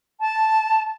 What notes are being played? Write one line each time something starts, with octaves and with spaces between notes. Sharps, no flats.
A5